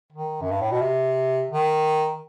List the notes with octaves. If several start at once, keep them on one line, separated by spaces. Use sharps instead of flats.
D#3
F#2
G2
A2
B2
C3
D#3